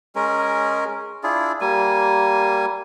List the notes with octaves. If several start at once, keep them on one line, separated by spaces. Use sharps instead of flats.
G#3 C#4 A#4
D4 E4 F4 G#4
G3 A#3 G#5